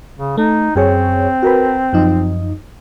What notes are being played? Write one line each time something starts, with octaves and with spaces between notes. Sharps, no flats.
C#3
A3 D#4
F#2 C4 G#4 C#5
F#4 A#4 B4
F#2 F3 D#4